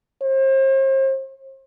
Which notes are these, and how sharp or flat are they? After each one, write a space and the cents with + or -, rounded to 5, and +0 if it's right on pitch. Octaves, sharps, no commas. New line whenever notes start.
C5 +40